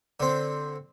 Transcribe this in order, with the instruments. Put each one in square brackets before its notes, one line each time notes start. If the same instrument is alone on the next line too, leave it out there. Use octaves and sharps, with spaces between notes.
[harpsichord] D3 C4